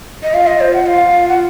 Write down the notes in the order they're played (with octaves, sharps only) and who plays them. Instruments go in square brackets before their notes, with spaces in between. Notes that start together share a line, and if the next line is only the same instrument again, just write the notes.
[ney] D#5
[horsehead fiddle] F4 [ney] F5
[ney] D#5
C5
F#5
[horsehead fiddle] F4 [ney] F5
[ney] F#5